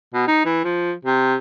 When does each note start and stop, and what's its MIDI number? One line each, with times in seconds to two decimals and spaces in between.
0.13 0.23 47
0.27 0.40 63
0.45 0.63 52
0.64 0.92 53
1.05 1.35 48